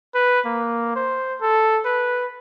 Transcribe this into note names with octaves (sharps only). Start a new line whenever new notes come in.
B4
A#3
C5
A4
B4